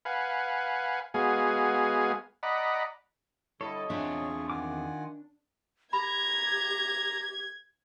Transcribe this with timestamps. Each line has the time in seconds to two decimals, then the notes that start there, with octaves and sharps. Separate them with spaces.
0.05 B4 F5 F#5 G#5
1.14 G#3 B3 F#4 G#4 F5 G#5
2.43 D5 D#5 F#5 A#5 B5
3.61 D3 G3 E4 A4 C#5 D#5
3.90 E2 C4 D4 F4 G#4 E5 C#6
4.50 D#3 F4 F#5 G#5 D6
5.93 G4 A#5 B5 G#6